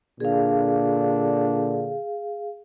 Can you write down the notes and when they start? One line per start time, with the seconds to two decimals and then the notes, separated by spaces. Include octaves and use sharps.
0.20 A#2 D3 D4 G#4 F5